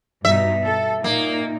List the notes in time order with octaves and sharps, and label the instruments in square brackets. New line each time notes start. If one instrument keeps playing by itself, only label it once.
[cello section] G2 B2 D#4 [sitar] E5
[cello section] A4
[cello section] A#2 D#4 [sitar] A#3